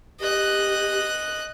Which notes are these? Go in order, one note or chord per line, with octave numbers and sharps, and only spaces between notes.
G4 D#5 F#6